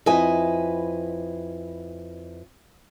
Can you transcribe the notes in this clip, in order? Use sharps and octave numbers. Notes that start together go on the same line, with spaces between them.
F2 E4 B4 D#5 G#5